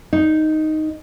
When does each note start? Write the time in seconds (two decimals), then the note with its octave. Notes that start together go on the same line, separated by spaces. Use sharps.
0.13 D#4